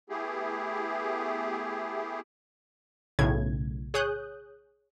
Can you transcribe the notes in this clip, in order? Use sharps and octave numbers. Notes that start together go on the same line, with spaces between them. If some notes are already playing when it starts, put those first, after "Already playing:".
A3 B3 E4 G4 G#4
B1 A2 C#3 G#6
G#4 C#5 D#6 F#6 G6